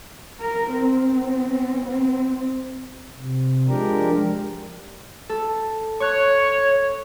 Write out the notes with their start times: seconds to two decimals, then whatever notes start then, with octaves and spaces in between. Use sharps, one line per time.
0.41 A#4
0.73 C4
1.85 C4
3.16 C3
3.68 F3 G#3 D4 G4 A#4
5.29 A4
6.00 C#5 C#6 F#6